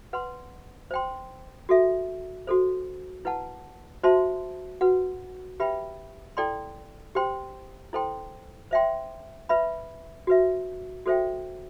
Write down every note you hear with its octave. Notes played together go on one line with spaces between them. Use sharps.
B4 F#5 C6
C5 G5 C6
F#4 A4 E5
F#4 A4 C5
E4 B4 F#5 A5
F#4 C5 E5 A5 C6
F#4 B4 F#5
G4 B4 E5 G5 B5
E4 A4 D5 G5 C6
G4 C5 G5 C6
E4 A4 C5 G5 C6
C5 E5 G5 C6
B4 E5 B5
F#4 B4 E5
F#4 A4 C5 E5 G5